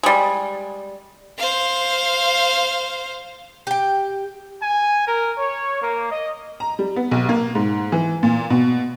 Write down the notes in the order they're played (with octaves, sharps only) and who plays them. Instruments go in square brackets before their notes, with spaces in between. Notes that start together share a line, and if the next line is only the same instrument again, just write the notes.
[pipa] G3 G#3
[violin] C5 F5
[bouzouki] G4 G5
[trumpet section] G#5
A#4
C#5
A#3
D#5
[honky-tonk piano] A#5
G3
B3
B1
A#3
G#2
E3
A#2
B2